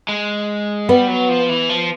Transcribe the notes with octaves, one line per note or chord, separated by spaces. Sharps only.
G#3
G3 B3
F#3
F3
E3
F3